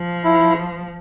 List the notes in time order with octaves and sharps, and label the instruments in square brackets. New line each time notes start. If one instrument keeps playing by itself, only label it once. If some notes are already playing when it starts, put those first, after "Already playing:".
Already playing: [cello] F3
[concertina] E4